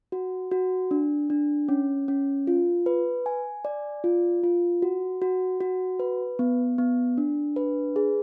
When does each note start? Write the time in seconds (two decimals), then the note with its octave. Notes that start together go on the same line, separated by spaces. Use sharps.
0.12 F#4
0.51 F#4
0.91 D4
1.30 D4
1.69 C#4
2.08 C#4
2.47 F4
2.86 B4
3.26 G#5
3.65 D5
4.04 F4
4.43 F4
4.82 F#4
5.22 F#4
5.61 F#4
6.00 B4
6.39 B3
6.78 B3
7.18 D4
7.56 B4
7.96 G#4